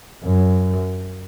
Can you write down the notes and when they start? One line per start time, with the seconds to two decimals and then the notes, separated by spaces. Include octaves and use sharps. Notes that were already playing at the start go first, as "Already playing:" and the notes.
0.24 F#2